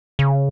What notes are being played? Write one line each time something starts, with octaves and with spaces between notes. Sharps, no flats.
C#3